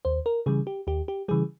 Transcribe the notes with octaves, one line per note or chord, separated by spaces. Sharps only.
D#2 C5
A#4
C#3 E3 G3 G#4
G4
D#2 G4
G4
C#3 E3 G3 G#4